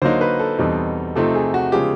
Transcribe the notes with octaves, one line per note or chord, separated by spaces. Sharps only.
D3 F#3 A#3 D#4 C5
B4
A4
E2 B2 G3 C4 D#4
C3 F3 A3 C4 D#4 A4
G#4
F#4
C#3 F3 G#3 B3 G4